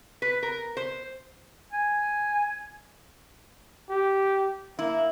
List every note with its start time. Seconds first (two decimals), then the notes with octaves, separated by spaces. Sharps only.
0.22 B4
0.43 A#4
0.77 C5
1.72 G#5
3.90 G4
4.79 A#3 E4